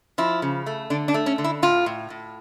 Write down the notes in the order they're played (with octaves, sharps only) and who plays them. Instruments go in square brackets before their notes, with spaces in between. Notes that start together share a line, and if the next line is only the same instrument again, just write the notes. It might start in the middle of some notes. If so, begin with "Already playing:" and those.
[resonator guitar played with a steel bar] F3 E4
C#3
A3
D3 D4
D4
A3
C#4
D3
E4
A2 F4
A2
A2